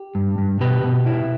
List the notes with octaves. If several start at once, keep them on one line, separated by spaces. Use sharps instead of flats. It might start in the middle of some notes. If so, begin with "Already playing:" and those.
Already playing: G4
G2
G2
B2 G4 B4
B2
E4